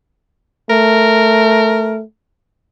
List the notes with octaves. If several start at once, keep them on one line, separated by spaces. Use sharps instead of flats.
A3 A#4